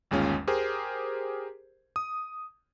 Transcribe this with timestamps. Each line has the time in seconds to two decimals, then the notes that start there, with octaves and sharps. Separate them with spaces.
0.11 G1 D#2 G#3 C#4 F4
0.48 G4 G#4 A#4 C5
1.96 D#6